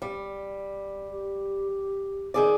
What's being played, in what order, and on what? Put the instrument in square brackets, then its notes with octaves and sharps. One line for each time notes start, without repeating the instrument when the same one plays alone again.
[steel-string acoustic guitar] G3
[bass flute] G4
[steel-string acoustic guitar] D#3 G#4 D5